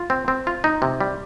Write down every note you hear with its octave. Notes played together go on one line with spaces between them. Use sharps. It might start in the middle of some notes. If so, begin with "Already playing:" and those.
Already playing: F4
C4
C4
F4
D#4
C3
G3